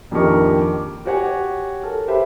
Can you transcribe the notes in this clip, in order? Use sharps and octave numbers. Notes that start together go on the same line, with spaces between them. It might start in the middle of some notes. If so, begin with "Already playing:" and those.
A#1 F2 D#3 G4 A#4 C#6
D6
F#4 G4 C#5 F#5 G#5
A4 A#4
G4 B4 C5 E5